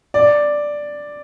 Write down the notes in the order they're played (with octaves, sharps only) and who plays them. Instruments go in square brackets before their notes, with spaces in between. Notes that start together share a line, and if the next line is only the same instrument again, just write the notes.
[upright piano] D5